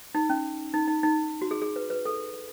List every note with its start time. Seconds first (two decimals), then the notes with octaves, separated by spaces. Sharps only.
0.15 D#4
0.30 C#4
0.74 D#4
0.87 D#4
1.03 D#4
1.42 F#4
1.51 G#4
1.62 G#4
1.76 B4
1.90 B4
2.06 A4